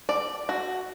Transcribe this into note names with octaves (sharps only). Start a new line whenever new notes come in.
D5
F#4